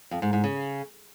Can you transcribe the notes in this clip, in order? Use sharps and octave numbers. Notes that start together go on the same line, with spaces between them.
F2
G#2
G#2
C#3